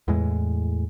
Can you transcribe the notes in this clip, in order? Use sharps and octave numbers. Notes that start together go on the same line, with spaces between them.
E2 A2 G#3